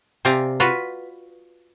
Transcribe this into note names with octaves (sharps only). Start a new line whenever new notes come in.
C3 C4 D5 F5 G#5 A#5
F4 F#4 B4